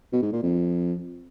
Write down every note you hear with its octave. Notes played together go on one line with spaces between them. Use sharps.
B2
G#2
A#2
F2